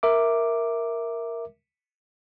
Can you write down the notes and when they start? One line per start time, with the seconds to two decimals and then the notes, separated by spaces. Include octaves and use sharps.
0.03 A#4 E5 D6